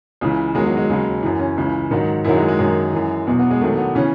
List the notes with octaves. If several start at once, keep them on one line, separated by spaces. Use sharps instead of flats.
C#2 C#3 E3
E2 D#3 F#3 G#3
F#3
G#3
D#2 C#3 F#3
F#2 E3
C#4
C#2 C#3 E3
G#2 D#3 F#3
F#2 D#3 F#3 E4
G#3
G#3
F#2 D#3 F#3
F#2 E3
E2 B2 F#3
B3
G#3
E2 D#3 F#3 A3
B3
C#3 E3 C#4